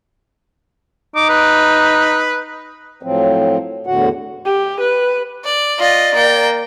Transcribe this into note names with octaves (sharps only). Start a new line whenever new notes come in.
D#4 D6
B4
A2 F3 F#3 C4
E2 A2 D3 F#4 F#5
G4
B4
D5
F4 D5 D#5
A#3 G5